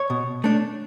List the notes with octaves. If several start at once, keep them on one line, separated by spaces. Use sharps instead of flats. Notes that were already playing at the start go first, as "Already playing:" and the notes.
Already playing: C#5
B2
A3 D4